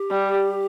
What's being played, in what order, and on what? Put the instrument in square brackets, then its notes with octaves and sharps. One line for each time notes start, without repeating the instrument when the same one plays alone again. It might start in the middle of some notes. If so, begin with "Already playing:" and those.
Already playing: [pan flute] G4
[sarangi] G3